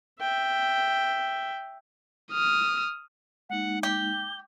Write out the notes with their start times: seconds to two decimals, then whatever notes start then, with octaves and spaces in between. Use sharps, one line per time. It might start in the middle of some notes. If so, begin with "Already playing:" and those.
0.20 E5 G5
2.32 D#6 F6
3.50 G#3 A#3 D#4 F#5
3.83 G4 G7